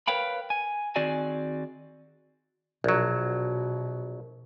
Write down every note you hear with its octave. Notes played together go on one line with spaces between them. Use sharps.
A#4 B4 C#5 F5 G5 B5
G#5
D#3 C4 F#4 G#4 D5 G#5
A#1 B2 F#3